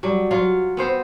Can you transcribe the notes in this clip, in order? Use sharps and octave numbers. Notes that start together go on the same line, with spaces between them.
F#3 G3
F#3 F4 F5
B3 C4 C5